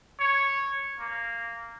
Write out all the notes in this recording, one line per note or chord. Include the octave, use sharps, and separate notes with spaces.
C#5
A#3